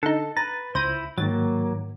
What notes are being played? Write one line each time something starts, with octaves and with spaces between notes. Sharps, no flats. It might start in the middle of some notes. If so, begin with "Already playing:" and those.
D3 D#4 A4
B4 A#5 A6
C#2 E4 C5 B5 G6 A#6 D#7
G#2 D#3 F#3 A#3 A6